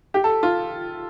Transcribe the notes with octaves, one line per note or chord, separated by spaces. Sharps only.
G4
A4
F4